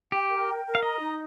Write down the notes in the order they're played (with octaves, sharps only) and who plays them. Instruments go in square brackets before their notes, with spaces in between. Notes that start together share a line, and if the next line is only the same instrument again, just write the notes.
[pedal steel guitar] G4 [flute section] G5
[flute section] A#4
G5
A#4
[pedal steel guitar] F5
[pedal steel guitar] D#5 [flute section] A#5
[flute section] D#4